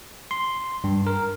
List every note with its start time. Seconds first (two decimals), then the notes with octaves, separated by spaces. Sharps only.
0.31 C6
0.84 G2
1.07 A#4